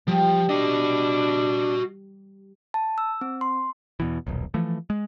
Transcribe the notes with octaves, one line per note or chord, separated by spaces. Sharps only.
F3 G3
D4 F#4 D#5
A5
E6
C4
C6
E2 B2 E3
D#1 B1
E3 F3 A3
G#3